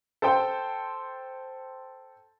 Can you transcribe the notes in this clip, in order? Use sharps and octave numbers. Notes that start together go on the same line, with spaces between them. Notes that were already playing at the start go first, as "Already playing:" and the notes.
A4 C5 G5